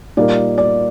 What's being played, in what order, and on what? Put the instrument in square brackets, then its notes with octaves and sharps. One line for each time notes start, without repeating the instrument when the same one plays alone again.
[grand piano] A#2 G3 A#3 D#4 A#4 [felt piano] D5
[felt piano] D5